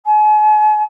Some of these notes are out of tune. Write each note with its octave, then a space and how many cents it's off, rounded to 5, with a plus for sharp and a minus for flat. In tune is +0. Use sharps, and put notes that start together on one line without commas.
G#5 +40